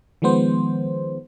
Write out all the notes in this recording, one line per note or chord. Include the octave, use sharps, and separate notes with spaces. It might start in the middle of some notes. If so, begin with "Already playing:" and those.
D#3 F3 G#3 B3 C5